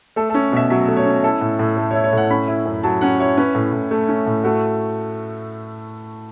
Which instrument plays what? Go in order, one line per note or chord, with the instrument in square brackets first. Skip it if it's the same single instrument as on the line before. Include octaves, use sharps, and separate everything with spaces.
[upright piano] A3 A4
A4
C#4
B2 E5
F#3 E5
A3
C#5
C#4
E4 A4
A2
A2
A3
C#5
E4
C#5
A2 F#5
C#4 B5
E4
F#2
F#3 A5
C#4 F#5
E4 C#5
C#4 B4
A2
A2
A3
C#4
A2
A3 F#4